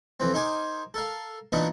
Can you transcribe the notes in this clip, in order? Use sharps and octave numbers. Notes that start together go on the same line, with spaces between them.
F2 E3 C4
D#4 A#4 C5 G#5 D6
A4 A#4 F5
A#2 E3 B3 D4 D#4 A#4